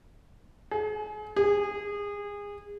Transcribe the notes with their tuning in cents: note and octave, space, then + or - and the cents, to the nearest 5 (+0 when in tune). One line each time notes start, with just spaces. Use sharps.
G#4 +35
G#4 -25